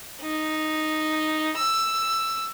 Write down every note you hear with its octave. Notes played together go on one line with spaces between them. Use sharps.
D#4
E6